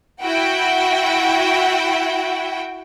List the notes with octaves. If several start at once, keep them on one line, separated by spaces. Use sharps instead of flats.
E4 F#4 G5